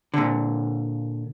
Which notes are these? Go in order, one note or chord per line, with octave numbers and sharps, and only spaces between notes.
A#2 D3